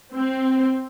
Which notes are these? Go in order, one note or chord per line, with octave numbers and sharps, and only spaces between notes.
C4